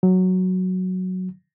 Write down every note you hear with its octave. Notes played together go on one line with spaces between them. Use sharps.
F#3